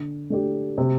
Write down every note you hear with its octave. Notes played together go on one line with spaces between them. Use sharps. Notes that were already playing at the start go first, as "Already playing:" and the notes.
Already playing: D3
A3 D4 G4
C3